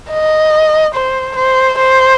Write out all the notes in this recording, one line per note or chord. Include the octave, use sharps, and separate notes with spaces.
D#5
C5
C5
C5